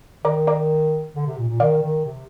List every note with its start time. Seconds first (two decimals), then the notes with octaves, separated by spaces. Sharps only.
0.25 D#3 A#4 D5
0.47 A#4 D5
1.16 D3
1.26 C3
1.38 A#2
1.49 A#2
1.60 D#3 D5 F5
1.83 D#3
2.05 C3